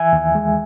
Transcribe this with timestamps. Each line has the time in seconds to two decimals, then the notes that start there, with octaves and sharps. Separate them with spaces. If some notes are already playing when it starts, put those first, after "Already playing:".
Already playing: E3 E5 G#5
0.13 D#2
0.35 G#3